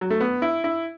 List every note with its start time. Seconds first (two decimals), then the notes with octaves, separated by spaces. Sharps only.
0.01 F#3
0.10 A3
0.20 B3
0.42 E4
0.64 E4